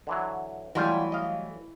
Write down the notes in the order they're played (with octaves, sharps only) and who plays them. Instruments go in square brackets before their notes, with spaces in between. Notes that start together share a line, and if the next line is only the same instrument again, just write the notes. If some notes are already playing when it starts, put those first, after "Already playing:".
[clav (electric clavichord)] D3 E3 F#3
[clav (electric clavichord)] B2 F4 G5 [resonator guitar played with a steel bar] E3 [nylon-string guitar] F#3 G3 A3
[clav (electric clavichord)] D#5 F5